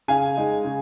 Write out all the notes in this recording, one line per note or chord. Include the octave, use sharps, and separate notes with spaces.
C#3 F5 G#5
G#3 D#4
C#3